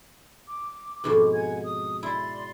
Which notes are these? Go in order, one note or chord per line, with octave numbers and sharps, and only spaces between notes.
D6
F2 G#2 B2
F#5 G#5 G#6
D#6
E4 D5 C6